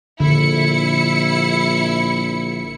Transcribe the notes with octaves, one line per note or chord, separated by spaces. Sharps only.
A#1 D3 E4 C#7